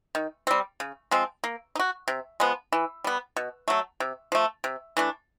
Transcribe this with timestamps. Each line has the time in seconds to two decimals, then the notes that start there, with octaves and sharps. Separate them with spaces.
0.15 D#3
0.47 G3 C4
0.80 C#3
1.11 F3 G#3 C4
1.44 A#3
1.75 D#4
1.79 F#4
2.08 C3
2.40 F3 G#3 B3
2.72 E3
3.04 G3 B3
3.36 B2
3.68 F#3 A3
4.00 C3
4.32 F3 A3
4.64 C3
4.97 E3 A3 D4